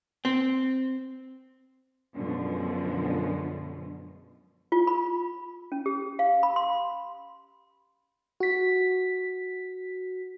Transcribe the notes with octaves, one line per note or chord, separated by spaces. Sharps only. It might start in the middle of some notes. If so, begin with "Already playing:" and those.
C4
F#2 B2 D3 F3 G#3
F4
B5
C#4
G4
F5
B5
C6
F#4 B6